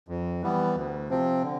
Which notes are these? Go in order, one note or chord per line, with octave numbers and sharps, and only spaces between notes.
F2
E3 G3 B3
D2
C3 F3 C4
D3